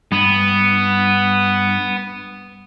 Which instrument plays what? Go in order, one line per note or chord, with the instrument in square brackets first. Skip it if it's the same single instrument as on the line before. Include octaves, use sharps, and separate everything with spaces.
[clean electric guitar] G2 [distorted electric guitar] B3